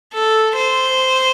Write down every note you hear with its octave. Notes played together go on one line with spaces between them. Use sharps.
A4
C5